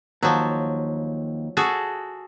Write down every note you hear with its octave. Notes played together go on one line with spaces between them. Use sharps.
D#2 F3 F#3
F#4 G#4 A4